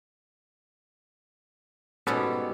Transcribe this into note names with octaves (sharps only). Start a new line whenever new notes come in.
G#2 B2 G3 B3 C#4 A4